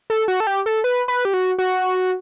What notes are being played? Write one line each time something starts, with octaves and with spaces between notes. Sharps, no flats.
A4
F#4
A4
G4
A4
B4
B4
G4
F#4
F#4